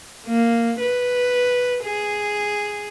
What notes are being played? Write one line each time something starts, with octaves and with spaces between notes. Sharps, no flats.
A#3
B4
G#4